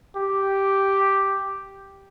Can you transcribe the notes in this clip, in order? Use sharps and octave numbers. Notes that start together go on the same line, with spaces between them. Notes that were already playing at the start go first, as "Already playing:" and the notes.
G4